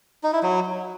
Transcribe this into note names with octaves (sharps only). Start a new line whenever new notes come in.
D#4
E4
F#3